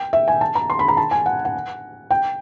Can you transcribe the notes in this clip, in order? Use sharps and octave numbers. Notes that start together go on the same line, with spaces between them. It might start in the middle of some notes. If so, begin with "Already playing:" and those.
Already playing: G5
E5
G#5
A5
A#5
C6
B5
A#5
A5
G#5
F#5
F#5
G5